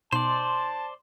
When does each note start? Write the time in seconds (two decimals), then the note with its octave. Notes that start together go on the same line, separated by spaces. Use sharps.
0.12 B2 D#4 C5 D5 A5 C6